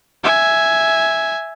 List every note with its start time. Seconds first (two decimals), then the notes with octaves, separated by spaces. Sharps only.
0.24 E5 G#5